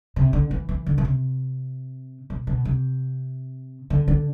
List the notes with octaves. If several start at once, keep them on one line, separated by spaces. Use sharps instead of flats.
C3
D3
E3
E3
D3
B2
C3
B2
B2
C3
D3
D3